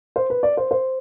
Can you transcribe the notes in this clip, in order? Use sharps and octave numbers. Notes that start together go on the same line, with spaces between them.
C5
B4
D5
C5
C5